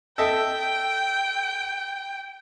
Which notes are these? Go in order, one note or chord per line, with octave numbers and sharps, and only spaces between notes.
A4 D#5 E5 G5